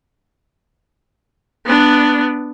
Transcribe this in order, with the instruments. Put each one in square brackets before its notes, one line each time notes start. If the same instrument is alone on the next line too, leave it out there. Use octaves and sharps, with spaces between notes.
[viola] B3 D4